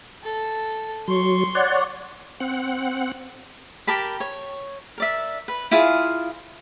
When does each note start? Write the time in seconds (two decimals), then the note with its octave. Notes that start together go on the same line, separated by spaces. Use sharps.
0.23 A4
1.08 F#3 C6 C#6
1.55 C#5 D5 F#5
2.40 C4 F#5
3.87 G4 A#4 A5 B5
4.20 C#5
4.98 A#4 D5 E5
5.48 B4
5.71 E4 F4 G#4 F5